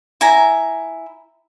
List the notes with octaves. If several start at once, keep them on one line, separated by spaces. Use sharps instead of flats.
E4 G#5 A#5